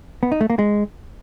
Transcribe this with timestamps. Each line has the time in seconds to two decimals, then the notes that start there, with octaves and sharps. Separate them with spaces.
0.23 B3
0.32 D#4
0.41 A3
0.50 A#3
0.59 G#3